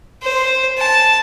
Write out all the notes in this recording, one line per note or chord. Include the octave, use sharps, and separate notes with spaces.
C5
A5